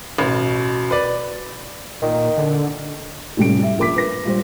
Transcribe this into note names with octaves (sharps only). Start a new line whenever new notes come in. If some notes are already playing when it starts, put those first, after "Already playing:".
A1 B2
B4 D5
A#2 D#3
D3
F1 A2 G3 C#4 D7
G3 E5
A#1 A#4 D6 B6
B4 A#6
A#2 G3 C5